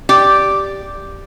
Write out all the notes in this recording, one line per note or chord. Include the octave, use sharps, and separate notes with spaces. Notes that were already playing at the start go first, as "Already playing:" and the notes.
G4 D5